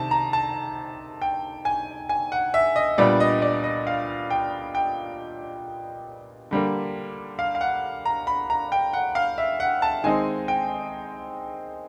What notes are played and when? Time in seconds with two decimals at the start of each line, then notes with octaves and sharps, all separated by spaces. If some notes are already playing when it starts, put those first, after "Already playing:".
Already playing: C3 D#3 A5
0.11 A#5
0.33 A5
1.22 G5
1.65 G#5
2.09 G#5
2.32 F#5
2.54 E5
2.76 D#5
2.98 A#2 G3 B3 D4 D5
3.20 D#5
3.42 D5
3.64 D#5
3.87 F5
4.30 G5
4.75 G5
6.51 D3 G3 A#3
7.39 F5
7.55 F5
7.61 F#5
8.05 A#5
8.27 B5
8.50 A#5
8.72 G5
8.93 F#5
9.15 F5
9.38 E5
9.60 F#5
9.82 A5
10.04 D#3 G#3 C4 D#4 G#5
10.48 G5